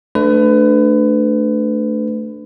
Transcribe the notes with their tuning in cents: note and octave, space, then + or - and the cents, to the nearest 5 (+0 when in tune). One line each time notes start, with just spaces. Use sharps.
A3 +0 D4 +5 B4 +30